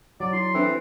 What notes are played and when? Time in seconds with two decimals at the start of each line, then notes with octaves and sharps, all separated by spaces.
0.20 F#3 D5
0.33 E4 C6
0.55 E3 C4 D4 A4 E6